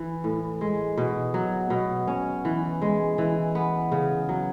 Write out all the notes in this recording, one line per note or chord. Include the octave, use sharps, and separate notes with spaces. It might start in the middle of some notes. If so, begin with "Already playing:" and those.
Already playing: E3
A2
G#3
B2
F#3
B2
C#4
E3
G#3
E3
B3
C#3
F#3